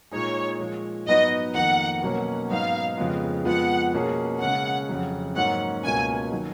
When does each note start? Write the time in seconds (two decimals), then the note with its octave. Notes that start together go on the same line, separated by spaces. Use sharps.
0.11 A#2 G#3 D#4 G#4 C#5
0.60 A#2 F3 G#3
1.07 G#2 F#3 B3 D#4 F#4 D#5
1.54 F2 D#3 A#3 F#5
2.02 B2 F#3 A#3 C#4
2.50 G#2 F#3 B3 D#4 F5
2.97 F2 C#3 G#3 B3 F4
3.45 F2 F3 G#3 B3 F#5
3.93 B2 A#3 C#4 G#4
4.41 C#3 G#3 C#4 F#5
4.89 F2 C#3 F#3
5.35 G#2 F#3 A#3 C#4 F#5
5.83 C#2 B2 A#3 C#4 G#5
6.32 D#3 F#3